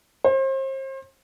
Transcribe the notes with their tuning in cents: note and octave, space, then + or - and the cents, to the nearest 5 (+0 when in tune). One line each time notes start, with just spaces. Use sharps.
C5 +35